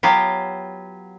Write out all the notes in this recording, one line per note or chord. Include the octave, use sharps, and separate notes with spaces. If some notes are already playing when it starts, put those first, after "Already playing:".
F#3 B3 F4 G4